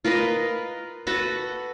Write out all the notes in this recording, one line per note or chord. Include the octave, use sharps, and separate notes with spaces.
F4 A#4 B4 D#5
F#4 A4 B4 F#5